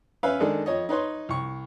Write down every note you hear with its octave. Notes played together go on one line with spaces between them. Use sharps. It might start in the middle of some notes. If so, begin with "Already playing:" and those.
C#4 B4 E5 F5
D#3 G#3 D4 A4
F2 C#5 D#5
D#4 B4 C#5 C6
C2 C#6